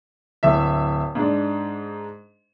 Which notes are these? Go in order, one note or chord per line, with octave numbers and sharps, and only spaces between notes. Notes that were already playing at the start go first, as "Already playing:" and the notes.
D1 E5
G#2 D4